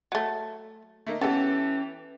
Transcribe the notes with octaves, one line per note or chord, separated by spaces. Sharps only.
F#3 A3
A3 A#3 D#4
E3 B3 C#4 G4 A4